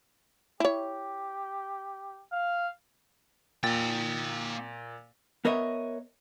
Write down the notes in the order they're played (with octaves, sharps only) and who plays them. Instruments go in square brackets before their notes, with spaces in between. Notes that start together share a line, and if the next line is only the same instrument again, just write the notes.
[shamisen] E4 C#5 [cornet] G4
[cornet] F5
[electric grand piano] A#2 A6 [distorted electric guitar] A#3 G5
[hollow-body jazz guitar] B3 A#4 C#5 D#5 E5